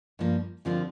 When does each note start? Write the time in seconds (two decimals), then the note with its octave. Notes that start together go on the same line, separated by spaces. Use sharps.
0.19 G2 F3 A#3
0.65 D#2 D3 F3 C4 F4